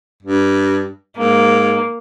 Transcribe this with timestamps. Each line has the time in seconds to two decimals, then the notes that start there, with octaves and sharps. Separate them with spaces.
0.23 G2
1.17 G#2 A#3